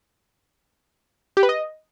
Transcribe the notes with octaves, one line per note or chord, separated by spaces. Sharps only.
G4
B4
D#5